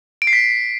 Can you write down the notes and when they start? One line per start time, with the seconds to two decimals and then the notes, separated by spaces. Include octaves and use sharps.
0.22 D7
0.27 C7
0.33 B6